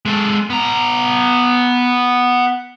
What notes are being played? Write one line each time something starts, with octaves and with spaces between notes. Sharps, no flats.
G#3 A4
B3 A#5